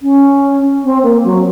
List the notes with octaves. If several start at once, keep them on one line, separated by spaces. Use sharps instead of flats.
C#4
C4
A#3
F#3